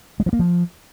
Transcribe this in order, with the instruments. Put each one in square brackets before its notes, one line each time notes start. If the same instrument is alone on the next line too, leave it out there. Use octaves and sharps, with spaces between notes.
[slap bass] G#3
F3
A#3
F3